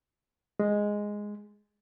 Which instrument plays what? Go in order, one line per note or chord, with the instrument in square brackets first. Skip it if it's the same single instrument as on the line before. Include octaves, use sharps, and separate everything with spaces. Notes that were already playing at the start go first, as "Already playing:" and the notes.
[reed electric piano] G#3